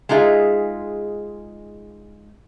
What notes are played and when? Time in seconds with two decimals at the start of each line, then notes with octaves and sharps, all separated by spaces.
0.09 G#3 D#4 F4 G#4 E5